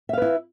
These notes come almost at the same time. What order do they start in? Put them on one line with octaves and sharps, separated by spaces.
E5 F5 B4 E4